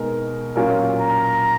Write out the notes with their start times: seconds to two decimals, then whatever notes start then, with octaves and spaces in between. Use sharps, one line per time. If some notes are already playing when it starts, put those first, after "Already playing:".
Already playing: B2 G#3 D#4 A#4
0.56 A#2 F#3 C#4 F4 A#4
1.02 A#5